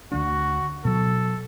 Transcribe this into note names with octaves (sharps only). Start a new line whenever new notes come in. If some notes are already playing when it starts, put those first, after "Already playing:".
D2 G#3 D4 F#4
B2 F#3 A4